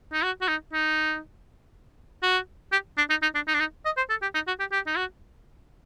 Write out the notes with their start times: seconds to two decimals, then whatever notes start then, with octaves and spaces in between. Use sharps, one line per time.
0.13 D#4
0.23 F#4
0.41 F#4
0.48 D#4
0.73 D#4
2.23 F#4
2.72 G4
2.98 D4
3.10 D#4
3.23 D#4
3.35 D4
3.48 D#4
3.54 D4
3.60 D#4
3.85 D#5
3.97 C5
4.10 A4
4.22 G4
4.35 D#4
4.47 F#4
4.60 G4
4.72 G4
4.87 D#4
4.97 F#4